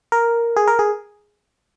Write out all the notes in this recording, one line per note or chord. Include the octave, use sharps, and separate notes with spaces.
A#4
G#4
A#4
G#4